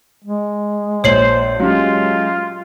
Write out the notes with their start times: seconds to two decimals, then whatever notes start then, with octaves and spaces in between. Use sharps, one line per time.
0.24 G#3
1.04 A#1 C5 C#5 C7 F#7
1.60 F#3 G#3 C#4 F4 G4